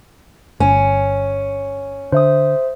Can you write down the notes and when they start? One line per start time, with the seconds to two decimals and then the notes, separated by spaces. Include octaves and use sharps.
0.60 G1 C#4
2.12 D3 C5 E5 D#6